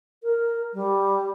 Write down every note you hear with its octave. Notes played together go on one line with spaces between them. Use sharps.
A#4
G3